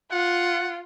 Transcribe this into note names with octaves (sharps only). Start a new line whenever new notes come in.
F4 F#5